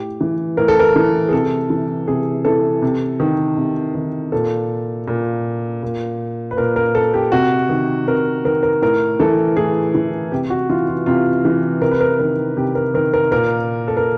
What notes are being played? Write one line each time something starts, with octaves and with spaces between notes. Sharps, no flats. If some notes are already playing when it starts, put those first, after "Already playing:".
Already playing: A2 G4
E3
A2 A#4
A4
A#4
E3
G#4
C3 A4
E3
C3 G#4
E3 A4
C3
D#3
C3
D#3
A#2 A4
A#2
A#2
B4
A#2 A#4
A#4
A4
G4
C3 F#4
D#3
C3 A#4
D#3 A#4
A#4
A2 A#4
E3 A4
A2 G#4
E3
C3 G4
F#4
E3 F4
F4
C3 F4
E3
C3 A#4
B4
A#4
D#3 A#4
C3 G4
A#4
D#3 A#4
A#4
A#2 A#4
A4
A#4